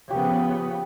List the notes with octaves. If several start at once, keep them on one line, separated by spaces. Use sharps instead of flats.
C#3 F3 B3 G4